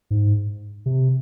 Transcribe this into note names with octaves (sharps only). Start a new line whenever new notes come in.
G#2
C3